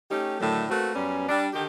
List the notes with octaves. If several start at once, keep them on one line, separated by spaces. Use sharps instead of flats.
A3 C#4 D#4 G4
A2 D3 D#3 F#3 A3
A3 A#3 C4 F#4 B4
F#2 G3 B3 C#4
G3 D4
D3 D#3 G4